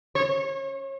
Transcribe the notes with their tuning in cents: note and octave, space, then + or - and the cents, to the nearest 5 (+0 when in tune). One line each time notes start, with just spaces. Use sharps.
C#5 -35